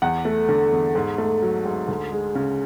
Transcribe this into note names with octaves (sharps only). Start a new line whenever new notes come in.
E2 F#5
A3
D3
E2
G#2
A3
F#3
G#2
D2
G#3
C#3